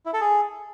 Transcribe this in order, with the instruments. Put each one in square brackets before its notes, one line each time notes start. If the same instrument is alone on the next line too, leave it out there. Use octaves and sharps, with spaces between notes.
[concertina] E4
A4
G#4